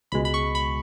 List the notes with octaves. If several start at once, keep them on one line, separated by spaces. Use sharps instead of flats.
C#2 B2 G#3 B5
B5
C#6
B5